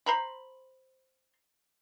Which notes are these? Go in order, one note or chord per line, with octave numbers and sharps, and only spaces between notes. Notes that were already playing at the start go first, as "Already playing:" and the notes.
C5 A#5 B5